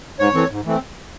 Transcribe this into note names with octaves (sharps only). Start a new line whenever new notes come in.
G#2 C#5
E3 A3 C4
G#2
E3 A3 C4